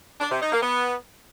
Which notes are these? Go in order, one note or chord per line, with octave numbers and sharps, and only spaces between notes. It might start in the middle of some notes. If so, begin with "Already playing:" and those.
D4
C3
D#4
A#3
B3